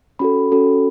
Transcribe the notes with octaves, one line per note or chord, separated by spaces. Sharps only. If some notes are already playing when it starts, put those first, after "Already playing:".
C#4 F#4 A4 B5
C#4 F#4 A4